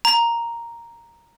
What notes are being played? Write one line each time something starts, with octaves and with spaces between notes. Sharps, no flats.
A#5